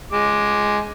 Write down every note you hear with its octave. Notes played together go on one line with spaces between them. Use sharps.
G#3 D6